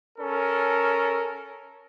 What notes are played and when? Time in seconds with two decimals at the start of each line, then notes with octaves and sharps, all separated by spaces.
0.18 C#4 A4 A#4